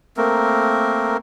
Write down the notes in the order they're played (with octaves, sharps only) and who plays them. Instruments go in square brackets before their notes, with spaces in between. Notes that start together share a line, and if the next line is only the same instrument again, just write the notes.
[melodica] A3 A#3 C4 A#4